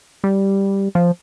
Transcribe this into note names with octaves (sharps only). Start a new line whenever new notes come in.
G3
F3